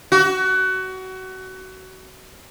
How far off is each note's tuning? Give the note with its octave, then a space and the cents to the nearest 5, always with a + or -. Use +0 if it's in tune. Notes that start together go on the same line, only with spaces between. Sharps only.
F#4 +25